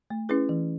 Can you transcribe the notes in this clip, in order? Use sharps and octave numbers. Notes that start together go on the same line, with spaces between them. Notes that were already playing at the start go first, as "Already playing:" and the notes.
A3
C#4 E4 G#4 B4
E3